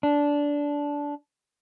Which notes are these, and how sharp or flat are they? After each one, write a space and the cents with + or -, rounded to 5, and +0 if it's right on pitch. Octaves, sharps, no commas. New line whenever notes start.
D4 -15